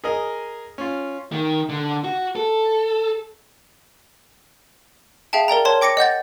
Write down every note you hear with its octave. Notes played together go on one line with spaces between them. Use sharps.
G#4 A#4 D#5
C#4 F4
D#3
D3
F#4
A4
G#4 E5 F5 G5 A5
A#4 D5 G5 A#5
A#4 C#5 A5 C6
G5 D6 A#6 C#7 D7
D#5 F#5 G6 A6